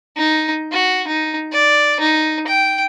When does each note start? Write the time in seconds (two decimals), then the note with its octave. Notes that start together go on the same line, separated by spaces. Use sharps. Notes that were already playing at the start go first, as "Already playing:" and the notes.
0.17 D#4
0.72 F#4
1.08 D#4
1.52 D5
2.00 D#4
2.47 G5